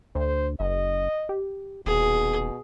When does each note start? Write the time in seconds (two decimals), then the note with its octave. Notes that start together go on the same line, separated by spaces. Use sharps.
0.15 D2 C5
0.60 F#1 D#5
1.29 G4
1.86 D#1 B2 G#4